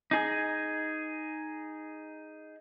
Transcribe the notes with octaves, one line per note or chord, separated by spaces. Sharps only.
D#4 G#4